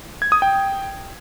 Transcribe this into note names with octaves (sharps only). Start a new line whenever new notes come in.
G#6
D#6
G5